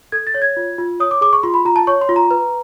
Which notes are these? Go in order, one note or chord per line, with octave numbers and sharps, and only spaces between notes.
A4 G#6
A6
C#5
G#6
F4
F4
C#5 D#6
D6
G#4 D6
C#6
F4 C6
B5
F4 A#5
A5
C#5 C#6
C6
F4
A#5
B4